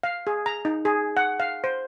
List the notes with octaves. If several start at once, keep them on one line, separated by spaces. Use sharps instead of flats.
F5
G#4
A#5
D#4
G#4
F#5
F5
C5